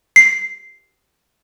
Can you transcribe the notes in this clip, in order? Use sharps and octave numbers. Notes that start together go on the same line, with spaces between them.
C7